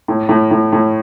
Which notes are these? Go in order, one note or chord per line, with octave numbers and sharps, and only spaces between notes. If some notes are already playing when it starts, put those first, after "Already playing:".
A2
A2
A2
A2